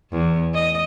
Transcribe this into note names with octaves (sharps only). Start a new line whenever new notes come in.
E2
D#5